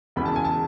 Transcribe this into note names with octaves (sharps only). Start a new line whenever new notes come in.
E1 E2 C#3 E3 B5
A5
G#5
A5